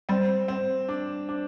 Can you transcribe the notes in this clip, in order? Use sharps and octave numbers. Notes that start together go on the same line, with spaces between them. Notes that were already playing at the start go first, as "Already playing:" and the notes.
G3 C4
C4
D4
D4